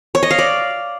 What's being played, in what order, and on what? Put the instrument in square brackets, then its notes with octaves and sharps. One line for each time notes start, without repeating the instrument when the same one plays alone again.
[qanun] C#5
D#5
F5
D5